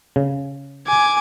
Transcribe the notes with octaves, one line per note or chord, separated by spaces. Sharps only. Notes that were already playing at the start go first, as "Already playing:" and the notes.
C#3
G#5 D6